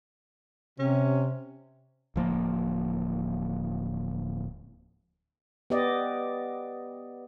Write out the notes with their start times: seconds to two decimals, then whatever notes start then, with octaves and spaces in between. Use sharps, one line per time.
0.79 C3 C#4
2.16 D1 F3 A#3
5.70 B3 G4 D5 D#5